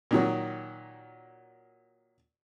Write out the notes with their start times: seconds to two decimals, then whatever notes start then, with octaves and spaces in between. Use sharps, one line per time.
0.11 A#2 D#3 F#3